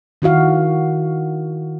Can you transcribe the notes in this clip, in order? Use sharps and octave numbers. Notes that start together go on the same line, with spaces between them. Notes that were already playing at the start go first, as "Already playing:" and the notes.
D#3 E4 F#4 F5